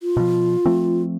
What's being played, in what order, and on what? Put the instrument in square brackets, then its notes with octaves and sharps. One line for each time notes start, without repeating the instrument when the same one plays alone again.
[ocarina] F4
[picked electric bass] B2 F3
F3 A3 C4